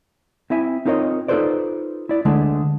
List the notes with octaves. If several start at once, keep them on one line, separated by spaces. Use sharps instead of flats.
C4 E4 E5 G#5
C4 D#4 F4 A#4 C#5 D#5
D#4 F4 A4 B4 C5 D5
E4 D5
D3 G#3 A3 D4